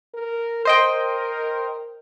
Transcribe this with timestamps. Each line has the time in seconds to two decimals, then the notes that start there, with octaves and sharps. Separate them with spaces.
0.14 A#4
0.65 A#4 C5 D#5 G5